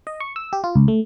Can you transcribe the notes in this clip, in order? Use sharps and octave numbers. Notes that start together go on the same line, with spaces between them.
D#5
C#6
E6
G4
F4
C#2
A3